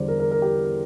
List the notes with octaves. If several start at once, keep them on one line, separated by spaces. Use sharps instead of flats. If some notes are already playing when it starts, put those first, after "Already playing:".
Already playing: E2 D3 G3 C5 D5
A#4
A#4
A#4
G4